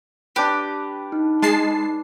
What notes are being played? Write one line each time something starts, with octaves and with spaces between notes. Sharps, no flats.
D4 G4 B4
D#4
G#3 A5 C7